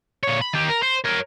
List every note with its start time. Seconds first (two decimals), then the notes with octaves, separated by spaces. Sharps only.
0.23 A#2 C#5
0.41 B5
0.53 D#3 G4
0.69 A#4
0.83 C5
1.05 A#4 C#5